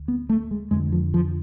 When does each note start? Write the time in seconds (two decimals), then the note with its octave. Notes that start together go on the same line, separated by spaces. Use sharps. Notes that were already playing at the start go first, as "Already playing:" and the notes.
Already playing: D2
0.08 B3
0.30 A3
0.51 G#3
0.71 F2 D3 G#3
0.92 F3
1.14 F3